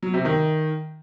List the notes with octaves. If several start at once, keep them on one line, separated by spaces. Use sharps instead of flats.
F#3
C3
D#3